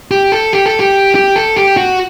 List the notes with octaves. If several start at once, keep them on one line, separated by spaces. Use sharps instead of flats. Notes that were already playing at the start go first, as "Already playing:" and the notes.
G4
A4
G4
A4
G4
G4
A4
G4
F#4